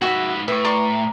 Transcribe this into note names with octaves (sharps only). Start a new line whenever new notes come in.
G#2 F#4 B4 E5
A2 B4 E5 C#6
D5 A#5 C6 C#6